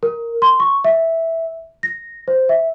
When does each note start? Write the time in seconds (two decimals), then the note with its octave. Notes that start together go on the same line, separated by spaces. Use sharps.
0.03 A#4
0.42 C6
0.60 C#6
0.84 E5
1.83 A#6
2.28 C5
2.49 E5